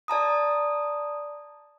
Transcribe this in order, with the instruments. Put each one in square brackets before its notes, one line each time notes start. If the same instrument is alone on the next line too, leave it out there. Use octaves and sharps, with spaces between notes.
[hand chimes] D5 A5 A#5 D#6